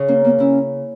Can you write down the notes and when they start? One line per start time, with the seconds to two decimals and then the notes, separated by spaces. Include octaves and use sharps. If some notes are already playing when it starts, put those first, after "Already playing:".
Already playing: C#3
0.08 A#3 C#4
0.24 A#3 B3
0.40 C#4 E4